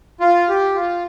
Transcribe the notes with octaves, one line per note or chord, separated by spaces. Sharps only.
F4
G4
F4